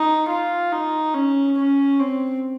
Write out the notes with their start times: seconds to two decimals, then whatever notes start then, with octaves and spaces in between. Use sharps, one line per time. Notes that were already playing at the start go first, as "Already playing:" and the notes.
Already playing: D#4
0.29 F4
0.72 D#4
1.14 C#4
1.58 C#4
2.00 C4